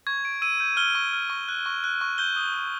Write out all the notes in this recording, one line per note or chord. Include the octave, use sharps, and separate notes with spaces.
C#6 G#6
C#6 D7
E6 D#7
G6 D#7
F6 G7
C#6
F6
C#6
F#6
C#6
F#6
C#6
G6 G7
D#6
G6